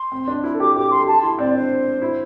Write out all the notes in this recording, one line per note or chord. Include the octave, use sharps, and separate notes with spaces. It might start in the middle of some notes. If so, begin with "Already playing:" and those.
Already playing: C6
C4
D4
E4
A4
G4 D6
G4 D6
A4 C6
G4 A5
E4 C6
C4 D5
D4 C5
E4